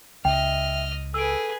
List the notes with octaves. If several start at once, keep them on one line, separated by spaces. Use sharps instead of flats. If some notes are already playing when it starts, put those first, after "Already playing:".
C#2 D#5 E5 G5 F6
G#4 A4 B4 E6 D7